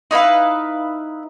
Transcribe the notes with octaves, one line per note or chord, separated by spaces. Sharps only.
D#4 E4 B4 F5